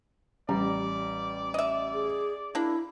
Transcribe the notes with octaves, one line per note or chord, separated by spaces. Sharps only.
A1 G3 D5 A#5
D#5 E5
G#4
A#3 D4 E4